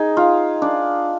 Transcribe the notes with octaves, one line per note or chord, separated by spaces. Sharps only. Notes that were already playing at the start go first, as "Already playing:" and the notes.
Already playing: D#4 G#4
F4
D4